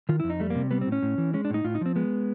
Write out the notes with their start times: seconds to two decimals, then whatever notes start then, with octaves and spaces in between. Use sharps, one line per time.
0.09 D#3 F4
0.20 F2 E4
0.30 D#4
0.40 G3 A3
0.50 C3 A#3
0.71 G3 B3
0.81 C4
0.87 A2
0.92 C#4
1.02 A2
1.18 E3
1.34 G#3 C#4
1.45 D4
1.50 A2 D#4
1.65 A2 F4
1.75 D#4
1.81 F3 C4
1.96 G#3 B3